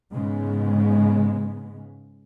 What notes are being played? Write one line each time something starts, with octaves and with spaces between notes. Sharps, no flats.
G#2 C#3 G#3 B3